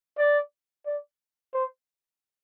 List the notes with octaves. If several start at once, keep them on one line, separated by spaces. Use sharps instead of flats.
D5
D5
C5